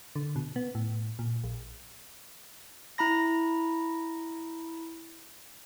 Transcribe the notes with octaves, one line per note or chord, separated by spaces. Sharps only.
D3
B2
B3
A2
A#2
A#1
E4 A#5 B5 A#6